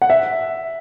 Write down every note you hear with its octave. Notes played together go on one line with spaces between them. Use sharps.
F#5
E5